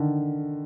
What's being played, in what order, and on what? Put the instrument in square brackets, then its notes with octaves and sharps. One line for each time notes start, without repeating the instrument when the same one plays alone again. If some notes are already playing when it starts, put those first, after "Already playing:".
Already playing: [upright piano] D3 D#3